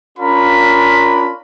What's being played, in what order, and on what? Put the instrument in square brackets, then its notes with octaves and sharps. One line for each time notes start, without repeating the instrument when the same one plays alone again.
[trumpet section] C#4 D4 F4 A#4 B5